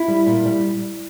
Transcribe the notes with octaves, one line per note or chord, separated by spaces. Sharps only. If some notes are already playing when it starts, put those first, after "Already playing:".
Already playing: E4
G3
A#2
G3